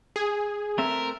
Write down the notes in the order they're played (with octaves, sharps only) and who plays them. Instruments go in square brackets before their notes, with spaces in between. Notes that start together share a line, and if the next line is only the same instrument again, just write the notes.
[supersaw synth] G#4
[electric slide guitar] A3 C4 E5 [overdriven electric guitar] A#4